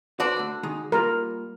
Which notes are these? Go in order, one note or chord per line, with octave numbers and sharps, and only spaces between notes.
F#4 B4 C5 D5 A5
D3 A3
D#3 G#3 D#4
G3 A#3 F4 A#4